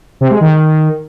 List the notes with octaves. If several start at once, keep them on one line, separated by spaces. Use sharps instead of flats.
C3
G#3
D#3